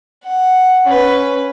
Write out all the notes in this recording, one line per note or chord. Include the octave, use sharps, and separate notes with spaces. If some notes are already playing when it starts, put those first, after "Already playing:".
F#5
C#4 B4